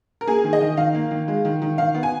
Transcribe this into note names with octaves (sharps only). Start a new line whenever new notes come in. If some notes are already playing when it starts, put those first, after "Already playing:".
A#4
A#3 G#4
D#3
D#5
D#3
D#3 F5
A#3
D#3
G#3
D#3
D#3
D#3 F5
B3
G#5